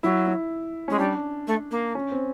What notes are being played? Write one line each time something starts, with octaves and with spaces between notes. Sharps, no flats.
F#3 E4
E4
G#3 C#4
G3 D4
A3
A#3
C#4
C4